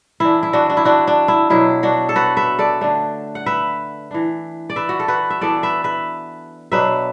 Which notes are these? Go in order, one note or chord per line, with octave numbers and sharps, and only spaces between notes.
E3 D4 E4
E4
D4 F#4
D4
E4
D4 F#4
D4
E4
B2 F#3 D4 E4
D4 F#4
A4
F#4 B4
B4 E5
A4 D5
D3 A3 D4
F#5
B4 E5
E3 D4
D5
B4 E5
F#4
A4
F#4 B4
E5
E3 B3 D4 A4 D5
B4 E5
B4 E5
B2 F#3 D4 B4 E5